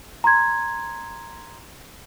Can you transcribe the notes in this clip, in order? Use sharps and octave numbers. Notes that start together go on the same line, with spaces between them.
A#5 C6 G#6